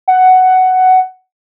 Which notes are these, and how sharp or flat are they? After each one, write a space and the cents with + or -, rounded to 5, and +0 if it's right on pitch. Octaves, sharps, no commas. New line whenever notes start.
F#5 +5